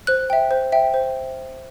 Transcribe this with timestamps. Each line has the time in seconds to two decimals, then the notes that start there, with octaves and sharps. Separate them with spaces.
0.07 C5 F#6
0.30 E5 G5
0.51 C5
0.72 E5 G5
0.94 C5